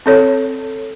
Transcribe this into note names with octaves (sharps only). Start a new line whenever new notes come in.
C4 A4 C#5